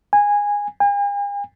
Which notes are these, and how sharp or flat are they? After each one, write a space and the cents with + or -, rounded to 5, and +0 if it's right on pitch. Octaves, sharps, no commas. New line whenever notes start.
G#5 -15
G#5 -45